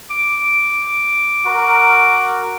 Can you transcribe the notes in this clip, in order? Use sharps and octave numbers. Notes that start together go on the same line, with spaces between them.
D6
F#4 A#4